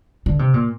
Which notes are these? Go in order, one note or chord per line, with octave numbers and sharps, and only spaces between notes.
D3
C3
A#2